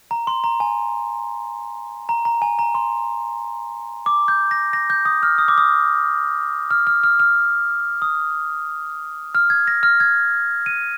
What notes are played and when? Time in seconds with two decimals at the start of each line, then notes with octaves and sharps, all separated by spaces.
0.11 A#5
0.27 C6
0.44 A#5
0.60 G#5
2.09 A#5
2.25 A#5
2.42 G#5
2.59 A#5
2.75 C6
4.06 D6
4.28 G6
4.51 A#6
4.73 A#6
4.90 G6
5.05 D#6
5.23 F6
5.38 D#6
5.48 D6
5.58 D#6
6.71 F6
6.87 F6
7.03 F6
7.20 F6
8.02 D#6
9.35 F6
9.50 G#6
9.67 A#6
9.83 F6
10.00 G#6
10.66 D#7